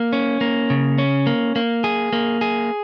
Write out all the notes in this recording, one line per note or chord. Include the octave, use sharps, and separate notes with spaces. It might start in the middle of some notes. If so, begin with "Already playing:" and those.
Already playing: A#3
C#4
A#3
C#3
C#4
A#3
A#3
G#4
A#3
G#4